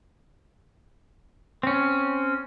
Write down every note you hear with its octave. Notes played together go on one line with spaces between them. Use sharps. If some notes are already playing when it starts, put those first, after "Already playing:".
C4 C#4